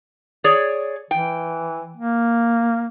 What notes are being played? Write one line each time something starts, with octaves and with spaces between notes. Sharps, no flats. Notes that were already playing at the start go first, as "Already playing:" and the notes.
G#4 C#5 D5
E3 G5
A#3